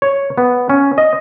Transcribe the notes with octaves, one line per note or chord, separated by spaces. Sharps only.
C#5
B3
C#4
D#5